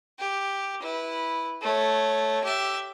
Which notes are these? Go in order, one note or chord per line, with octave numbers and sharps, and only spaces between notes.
G4
E4 B4
A3 C#5
G4 E5